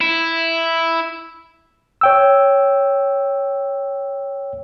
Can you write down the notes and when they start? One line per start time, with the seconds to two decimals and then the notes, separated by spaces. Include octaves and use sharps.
0.01 E4
2.01 C#5 G5 E6